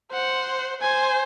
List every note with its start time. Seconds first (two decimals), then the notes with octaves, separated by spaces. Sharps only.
0.12 C5 F#5
0.81 C5 G#5